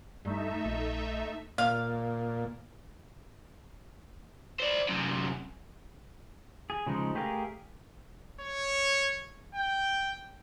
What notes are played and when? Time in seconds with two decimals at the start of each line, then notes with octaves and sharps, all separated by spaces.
0.25 G2 A3 D#4 E5
0.64 A#1
1.58 A#2 F5
4.60 C5 D5
4.88 F#2 C3
6.70 G#4
6.87 C#3 F3 G#3 D#4
7.15 A3 G4 G#4 A#4 F5
8.41 C#5
9.55 G5